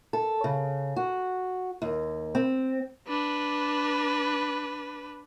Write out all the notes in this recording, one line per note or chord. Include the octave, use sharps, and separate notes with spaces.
A4
C#3
F#4
D#2
C4
D4 B4